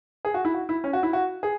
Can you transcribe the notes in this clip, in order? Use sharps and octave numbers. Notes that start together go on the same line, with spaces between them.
G#4
F#4
E4
F#4
E4
C#4
F#4
E4
F#4
G#4